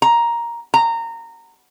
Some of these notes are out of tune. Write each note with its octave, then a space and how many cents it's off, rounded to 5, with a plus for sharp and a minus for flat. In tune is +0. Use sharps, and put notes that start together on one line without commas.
A#5 +10
A#5 -20